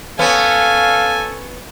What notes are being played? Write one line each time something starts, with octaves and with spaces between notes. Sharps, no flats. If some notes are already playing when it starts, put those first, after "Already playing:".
B3 C#4 A4 F5 G#5